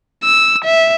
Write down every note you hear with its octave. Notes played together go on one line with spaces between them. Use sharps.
E6
E5